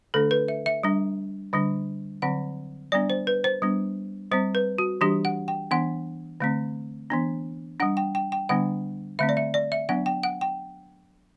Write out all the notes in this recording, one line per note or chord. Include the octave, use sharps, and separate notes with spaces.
D3 A3 D4 A4
B4
E5
E5
G3 D4
D3 G3 D4
D3 F#3 C4 F#5
G3 B3 D4 D5
C5
B4
C5
G3 B3 D4
G3 C4 C5
B4
F#4
E3 G3 D4 G4
F#5
G5
E3 B3 D4 F#5
D3 A3 C4
E3 B3 D4
G3 D4 F#5
G5
G5
G5
D3 G3 B3 D4 F#5
D3 A3 C4 E5
D5
E5
D5
E5
F#3 B3 D4 F#5
G5
F#5
G5